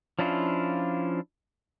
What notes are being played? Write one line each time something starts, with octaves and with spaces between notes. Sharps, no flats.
F3 C#4 D4 E4 F4